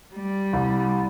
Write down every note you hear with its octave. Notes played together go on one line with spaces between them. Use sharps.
G3
C2